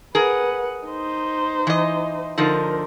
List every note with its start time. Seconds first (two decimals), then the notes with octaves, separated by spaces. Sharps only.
0.15 G#4 A#4 B4 F#5
0.87 D#4 C5
1.67 E3 D#5
2.38 D3 F3 D#4 A#4